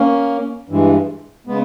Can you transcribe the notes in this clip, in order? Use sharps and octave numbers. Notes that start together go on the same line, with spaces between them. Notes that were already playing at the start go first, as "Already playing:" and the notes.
Already playing: A#3 C#4
G2 E3 G#3
C#3 G#3 B3